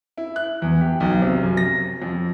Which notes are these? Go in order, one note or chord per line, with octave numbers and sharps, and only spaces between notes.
E4
F#6
E2
G4
B1
C3
F#2
A#6
F2